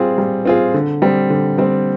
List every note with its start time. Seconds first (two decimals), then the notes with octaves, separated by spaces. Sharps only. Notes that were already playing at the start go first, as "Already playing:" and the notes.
Already playing: G3 C4 F4 G#4
0.18 G3
0.45 C4 F4 G#4
0.74 D3
1.02 G3 C4
1.30 D3
1.58 G3 C4